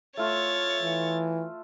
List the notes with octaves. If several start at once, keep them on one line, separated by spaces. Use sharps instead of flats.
A3 F4 C#5 E5 A6
E3